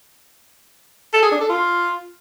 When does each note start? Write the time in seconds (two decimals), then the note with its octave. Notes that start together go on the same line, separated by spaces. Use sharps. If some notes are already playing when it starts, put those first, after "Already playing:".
1.13 A4
1.23 G#4
1.32 D4
1.41 A4
1.50 F4